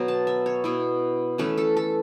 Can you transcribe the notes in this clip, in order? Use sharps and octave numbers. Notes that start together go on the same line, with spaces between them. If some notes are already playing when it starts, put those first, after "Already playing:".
Already playing: B2 F#3 B3
A5
E5
C#5
B2 B3 E4
E3 A3 C#4 B4
A4
A4